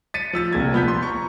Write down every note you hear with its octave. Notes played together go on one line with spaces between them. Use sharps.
A6 B6 C#7 D#7
F3 E6 A6
C2 A#2 G#6
F3 B3 G6 B6
C6
A#5 C#6